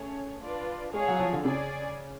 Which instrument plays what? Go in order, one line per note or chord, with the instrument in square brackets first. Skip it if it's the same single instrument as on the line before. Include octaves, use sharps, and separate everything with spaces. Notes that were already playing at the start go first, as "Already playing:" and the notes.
Already playing: [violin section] A3 C#4 G#4 C#5
D4 F4 B4 D5
[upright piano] G#3 [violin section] G#4 C#5 F5
[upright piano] F#3
F3
D3
[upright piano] C#3 [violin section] C#4 G#4 D5 G#5